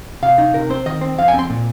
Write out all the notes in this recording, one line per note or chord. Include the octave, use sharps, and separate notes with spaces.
C3 F5
D#4
C3 A#4
C4 C5
D#3 D#5
C4
F2 F5
G#5
C4 C6
A#2